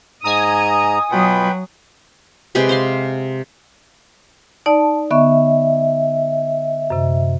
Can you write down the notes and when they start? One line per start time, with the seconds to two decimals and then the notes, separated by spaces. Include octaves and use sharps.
0.24 G#2 D#5 G#5 A#5 D#6
1.12 B2 F#3 F4 B4 G5 B5
2.55 C3 G#3 G4 B4
2.69 C5 F5 C6
4.66 D#4 D5 A5
5.11 D3 B3 D#5 E5 C#6
6.90 F#2 C3